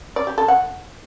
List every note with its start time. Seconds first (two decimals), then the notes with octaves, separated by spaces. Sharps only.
0.16 D5
0.27 G4
0.38 A4
0.48 F#5